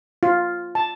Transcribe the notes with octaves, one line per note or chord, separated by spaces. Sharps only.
F4
A5